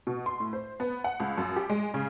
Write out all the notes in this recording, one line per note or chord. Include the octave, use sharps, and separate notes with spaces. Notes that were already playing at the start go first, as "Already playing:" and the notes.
B2
C6
A2
C5
B3
F#5
C#2
F#2
G4
G#3
C#3